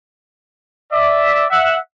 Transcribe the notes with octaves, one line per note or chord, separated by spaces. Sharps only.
D5 E5
E5 F#5